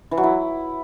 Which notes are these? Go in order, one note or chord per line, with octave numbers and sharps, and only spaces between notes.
E3
F#3
E4